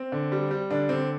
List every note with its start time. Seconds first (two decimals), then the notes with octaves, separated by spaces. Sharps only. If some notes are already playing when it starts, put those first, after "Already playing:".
Already playing: C4
0.12 D3
0.32 G3
0.51 G3
0.71 D3 D4
0.89 D3 C4